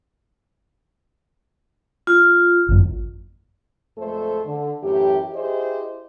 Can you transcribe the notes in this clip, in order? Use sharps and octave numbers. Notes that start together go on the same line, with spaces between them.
F4
G#1 F#2
F2 A#2 G#3 A3 A4 C5
D3
F#2 A2 E3 G4
E4 G4 G#4 C5 D5 D#5